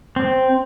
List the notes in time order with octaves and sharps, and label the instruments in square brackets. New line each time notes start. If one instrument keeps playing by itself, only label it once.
[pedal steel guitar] C4